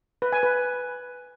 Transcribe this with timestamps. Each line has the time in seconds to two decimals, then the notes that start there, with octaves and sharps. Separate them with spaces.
0.22 B4
0.32 G#5
0.43 B4